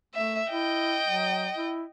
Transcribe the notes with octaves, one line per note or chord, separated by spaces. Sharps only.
A3 E5
E4 D#5 G5
F#3
E4